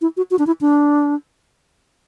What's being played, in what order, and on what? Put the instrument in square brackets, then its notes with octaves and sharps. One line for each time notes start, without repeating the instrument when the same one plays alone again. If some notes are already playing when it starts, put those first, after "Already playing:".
[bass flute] E4
F#4
F#4
D4
E4
D4